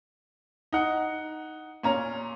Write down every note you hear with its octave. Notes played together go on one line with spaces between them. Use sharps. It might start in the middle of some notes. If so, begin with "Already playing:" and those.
D#4 F#5
A#2 C#4 A#5